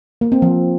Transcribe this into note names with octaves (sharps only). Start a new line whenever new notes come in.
A#3
C4
F3